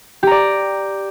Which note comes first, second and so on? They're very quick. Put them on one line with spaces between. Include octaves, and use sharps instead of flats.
G4 A#5 D5